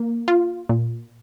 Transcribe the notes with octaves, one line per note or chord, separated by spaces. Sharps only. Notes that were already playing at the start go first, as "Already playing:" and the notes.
Already playing: A#3
F4
A#2